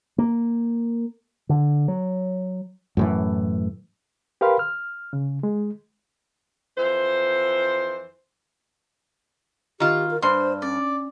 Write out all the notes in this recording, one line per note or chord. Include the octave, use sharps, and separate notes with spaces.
A#3
D3
F#3
F#2 A2 E3
G4 A#4 B4 F5 B5 C6
F6
C#3
G#3
F2 E3 C5
D#3 F4 G4
A#4
G2 C5 C6
C#4 D5